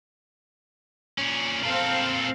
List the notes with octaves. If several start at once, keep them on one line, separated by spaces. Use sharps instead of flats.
A#2 C#4
A#2 C4 A4 F5